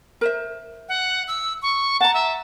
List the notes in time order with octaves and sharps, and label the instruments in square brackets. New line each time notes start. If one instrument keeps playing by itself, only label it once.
[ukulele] A#4 C5 E5
[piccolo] F#5
E6
C#6
[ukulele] F#5 A#5 [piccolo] A5
[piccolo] E5